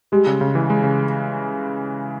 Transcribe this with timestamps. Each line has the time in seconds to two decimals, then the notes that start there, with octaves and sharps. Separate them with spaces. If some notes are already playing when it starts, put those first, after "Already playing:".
0.12 G3 G#3
0.27 C#3
0.41 C#3
0.55 E3
0.70 G#3
0.84 C#3